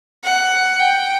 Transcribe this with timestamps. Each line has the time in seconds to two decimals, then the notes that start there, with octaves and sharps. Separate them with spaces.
0.24 F#5
0.79 G5